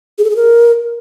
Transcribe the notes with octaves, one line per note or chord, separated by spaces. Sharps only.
G#4
A4
G#4
A#4